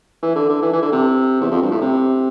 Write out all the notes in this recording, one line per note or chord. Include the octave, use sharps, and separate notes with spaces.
E3
D3
D3
E3
E3
D3
C3
E2
F2
G2
A2
C3